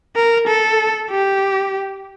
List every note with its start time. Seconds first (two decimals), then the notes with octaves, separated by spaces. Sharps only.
0.16 A#4
0.47 A4
1.11 G4